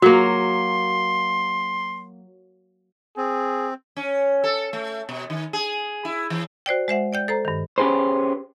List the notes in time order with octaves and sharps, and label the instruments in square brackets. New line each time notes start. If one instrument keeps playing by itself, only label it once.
[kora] F#3 A#3 [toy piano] F#4 G#4 A#4 [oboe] C6
[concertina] C4 [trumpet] G#4
[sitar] C#4
A4
A3
B2
D#3
G#4
E4
E3
[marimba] F#4 C5 D5 G5
G#3 C5 E5 F#5
D5 G5 G6
A4 C5 A#5
G2 D#3
[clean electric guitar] C#4 G4 G#4 B4 C5